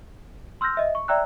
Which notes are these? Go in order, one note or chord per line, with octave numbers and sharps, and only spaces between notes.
C6 E6 F6 G6 A#6
D#5 E5
C#6
D5 E5 G5 A#5 E6 F#6